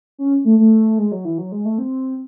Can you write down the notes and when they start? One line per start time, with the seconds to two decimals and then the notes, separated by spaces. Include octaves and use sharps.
0.18 C#4
0.45 A3
0.59 A3
0.98 G#3
1.12 F#3
1.25 E3
1.38 F#3
1.52 G#3
1.65 A3
1.78 C4